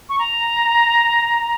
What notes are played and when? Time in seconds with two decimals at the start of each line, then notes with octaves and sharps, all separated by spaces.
0.09 C#6
0.19 A#5